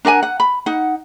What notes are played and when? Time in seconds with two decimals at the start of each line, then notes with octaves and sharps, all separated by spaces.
0.05 D4 A#4 F#5 G#5
0.23 F#5
0.40 B5
0.66 D#4 F#5